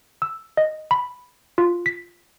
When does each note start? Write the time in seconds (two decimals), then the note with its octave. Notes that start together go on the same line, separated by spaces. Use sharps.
0.22 E6
0.57 D#5
0.91 B5
1.58 F4
1.86 B6